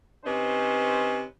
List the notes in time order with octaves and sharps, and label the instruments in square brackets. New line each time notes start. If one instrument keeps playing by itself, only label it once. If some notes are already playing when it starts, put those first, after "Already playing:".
[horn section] C3 C#4 D#4 B4 C5